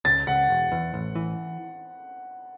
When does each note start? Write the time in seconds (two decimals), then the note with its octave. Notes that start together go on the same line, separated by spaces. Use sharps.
0.05 C#2 A6
0.27 C#2 F#5
0.50 E1
0.72 E2
0.94 A1
1.15 E3